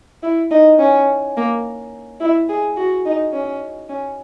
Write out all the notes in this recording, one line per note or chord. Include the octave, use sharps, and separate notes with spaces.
E4
D#4
C#4
A#3
E4
G#4
F#4
D#4
C#4
C#4